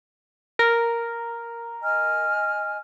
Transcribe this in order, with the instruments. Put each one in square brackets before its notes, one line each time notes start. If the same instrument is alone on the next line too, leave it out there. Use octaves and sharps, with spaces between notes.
[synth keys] A#4
[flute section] D#5 G#5 F6